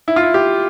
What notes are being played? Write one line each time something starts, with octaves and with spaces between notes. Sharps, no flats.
E4
F4
E4
G4